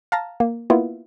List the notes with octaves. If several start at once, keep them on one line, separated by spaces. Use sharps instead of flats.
F5 A5 A#5
A#3
A#3 B3 E4 F4